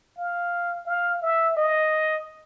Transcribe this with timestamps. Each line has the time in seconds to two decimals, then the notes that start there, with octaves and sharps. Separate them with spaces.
0.18 F5
0.87 F5
1.21 E5
1.57 D#5